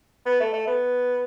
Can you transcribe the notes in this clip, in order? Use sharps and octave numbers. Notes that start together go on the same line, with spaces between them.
B3
A3
A3
B3